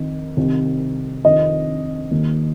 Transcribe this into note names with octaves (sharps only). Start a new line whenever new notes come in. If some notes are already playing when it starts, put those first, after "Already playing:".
Already playing: F2 D#3
C2 C3 D#3
F2 C3 D#3 D#5
D#2 D#3